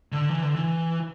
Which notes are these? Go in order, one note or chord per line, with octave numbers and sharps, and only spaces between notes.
D3
E3
D3
E3